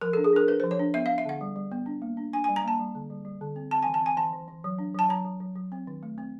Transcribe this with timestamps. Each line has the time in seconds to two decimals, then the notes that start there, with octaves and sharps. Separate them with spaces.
0.01 F3 A#4
0.13 A4
0.17 D4
0.24 G#4
0.33 D4 A#4
0.48 D4 B4
0.60 C5
0.63 F3
0.71 C#5
0.79 D4
0.94 B3 E5
1.06 F5
1.10 D4
1.18 E5
1.25 D3 F#5
1.41 G3
1.56 G3
1.72 B3
1.86 D4
2.02 A#3
2.17 D4
2.33 D4 G#5
2.44 G#5
2.48 G3
2.56 A#5
2.64 A#3 A5
2.80 G3
2.95 D3
3.10 G3
3.25 G3
3.41 D3
3.56 C4
3.71 C4 A5
3.82 G#5
3.87 E3
3.94 A5
4.02 C4 G#5
4.17 E3 A5
4.33 E3
4.48 E3
4.64 F#3
4.79 D4
4.94 F#3 A5
5.09 F#3 A#5
5.25 F#3
5.40 F#3
5.55 F#3
5.72 C4
5.87 D#3
6.03 A3
6.18 C4